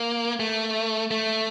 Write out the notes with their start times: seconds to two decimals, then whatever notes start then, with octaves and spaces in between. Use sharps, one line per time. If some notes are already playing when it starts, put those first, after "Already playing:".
Already playing: A#3
0.40 A3
1.11 A3